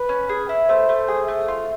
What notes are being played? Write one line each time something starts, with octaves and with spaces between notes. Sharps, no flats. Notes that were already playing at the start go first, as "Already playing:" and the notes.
Already playing: B4
C#4
G#4
E4
A3 C5
A3
G#4
A3
F4